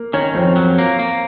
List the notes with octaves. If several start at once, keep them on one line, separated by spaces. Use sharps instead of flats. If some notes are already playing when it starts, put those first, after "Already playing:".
Already playing: A#3
D#3 C#4 C#5
F2 C4 C5
F#3
A#3
A#3